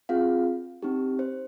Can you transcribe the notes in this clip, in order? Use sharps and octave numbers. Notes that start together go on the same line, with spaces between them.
C4 F4 G#4 F5
C4 D#4 G4
C5